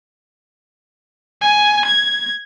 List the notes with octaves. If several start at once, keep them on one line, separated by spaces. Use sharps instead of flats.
G#5
G#6